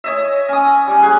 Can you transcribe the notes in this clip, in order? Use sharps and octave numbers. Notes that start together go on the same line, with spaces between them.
C#5 D#5 E5
C#4 D#6
G3 C#4
G#4 F#5 G#5